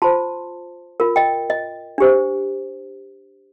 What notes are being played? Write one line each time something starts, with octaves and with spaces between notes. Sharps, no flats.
F4 C5 A5 C6
F4 A#4
D#5 G5
D#5
D4 G4 C5